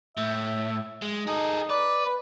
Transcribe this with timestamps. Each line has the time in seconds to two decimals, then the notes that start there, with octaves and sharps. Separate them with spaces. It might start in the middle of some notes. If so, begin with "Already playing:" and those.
0.17 A2 E5
1.02 G#3
1.27 D#4 G#4 A4
1.70 B4 D5
2.06 B4